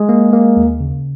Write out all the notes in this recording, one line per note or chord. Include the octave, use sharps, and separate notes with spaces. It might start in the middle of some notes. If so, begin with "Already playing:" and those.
Already playing: G#3 G#4
A#3
A#3
D#2
C#3